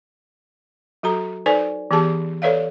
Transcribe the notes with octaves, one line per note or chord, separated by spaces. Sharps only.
F#3 F#4 A4 A#5
D#4 A4 B4 C5 D5 G#5
E3 B3 G4 G#4 A5
A4 B4 C#5 D5 E5 F5